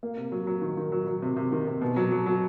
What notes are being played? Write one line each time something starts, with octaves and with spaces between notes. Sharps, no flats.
A#3
C3
F#3
F#3
D#3
D#3
F#3
F#3
C3
C3
D#3
C3
B2
F#3
F#3
F#3